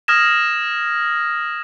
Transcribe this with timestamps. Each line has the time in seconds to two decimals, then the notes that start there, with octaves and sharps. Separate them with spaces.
0.08 D#6 F6 G#6 A#6 E7